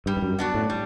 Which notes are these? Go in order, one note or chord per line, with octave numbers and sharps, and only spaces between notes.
G2 G3
G2
F#2
B3 D4 F#4
A2
G3